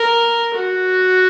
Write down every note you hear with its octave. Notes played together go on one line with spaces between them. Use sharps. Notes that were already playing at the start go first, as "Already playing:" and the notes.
Already playing: A#4
F#4